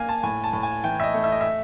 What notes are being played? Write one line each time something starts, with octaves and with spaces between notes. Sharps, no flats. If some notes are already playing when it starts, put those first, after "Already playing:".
Already playing: A#3 F5 G#5
A5
A2 G#5
A5
A2
G#5
E3 G5
E5
D#5
A3
E5
D#5
E5